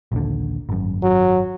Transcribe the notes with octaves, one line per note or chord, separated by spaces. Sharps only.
A#1 D#2 D3
G#1 F#2
F#3